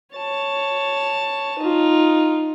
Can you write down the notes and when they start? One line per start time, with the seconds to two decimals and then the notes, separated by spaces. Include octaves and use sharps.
0.14 C#5 A5
1.59 D#4 F4